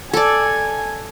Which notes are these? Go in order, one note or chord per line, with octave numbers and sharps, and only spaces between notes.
A4 D5 G#5